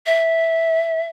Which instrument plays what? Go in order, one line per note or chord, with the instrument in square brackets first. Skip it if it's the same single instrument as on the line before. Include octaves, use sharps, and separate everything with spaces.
[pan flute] E5